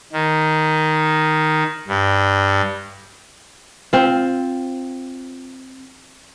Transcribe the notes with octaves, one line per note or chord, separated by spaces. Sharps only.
D#3
G2
C4 F4